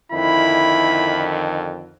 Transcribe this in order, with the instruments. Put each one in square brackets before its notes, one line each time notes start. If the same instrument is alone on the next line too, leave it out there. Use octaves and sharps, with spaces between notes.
[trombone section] F2 D3 D#3 [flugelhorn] E4 [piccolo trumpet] B5